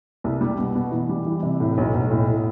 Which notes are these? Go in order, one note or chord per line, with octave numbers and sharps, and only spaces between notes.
C2
G3
B2
B2
E3
G3
E3
C3
A2
B1
B1
A2
A2